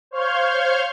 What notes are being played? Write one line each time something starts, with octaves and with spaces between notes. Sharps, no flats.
C5 C#5 F5 F6 G6 G#6